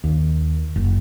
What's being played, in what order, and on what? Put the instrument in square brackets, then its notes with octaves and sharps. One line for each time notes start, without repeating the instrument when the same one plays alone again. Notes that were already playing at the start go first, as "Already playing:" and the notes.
[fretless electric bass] D#2
F#1